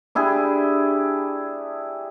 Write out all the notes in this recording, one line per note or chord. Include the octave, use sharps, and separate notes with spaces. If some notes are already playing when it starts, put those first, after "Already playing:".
D4 E4 G4 G#4